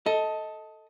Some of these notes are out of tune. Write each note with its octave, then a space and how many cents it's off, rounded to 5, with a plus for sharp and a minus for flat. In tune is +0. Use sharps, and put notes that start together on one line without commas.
A4 +0 D#5 +20